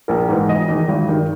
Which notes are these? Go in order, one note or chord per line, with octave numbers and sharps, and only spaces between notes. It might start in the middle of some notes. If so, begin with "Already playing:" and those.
A#1 A#4
G#2 E3
E1 D#5
E2 D#3
G#1
G2 D#3